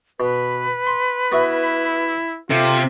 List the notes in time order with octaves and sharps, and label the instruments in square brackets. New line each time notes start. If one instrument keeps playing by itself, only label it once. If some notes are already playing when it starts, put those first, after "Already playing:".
[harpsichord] B2 [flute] B4
[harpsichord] C6
[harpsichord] B3 F#4 E5 [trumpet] E4
[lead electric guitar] C3 [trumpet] F4 [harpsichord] A4